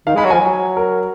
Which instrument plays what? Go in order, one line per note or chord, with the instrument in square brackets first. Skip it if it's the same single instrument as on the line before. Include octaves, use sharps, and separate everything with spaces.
[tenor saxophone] D#3 [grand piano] F5
[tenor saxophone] G#3 [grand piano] B5
[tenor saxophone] F#3
[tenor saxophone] F3 [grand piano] G#5
[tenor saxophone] F#3
[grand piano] A#4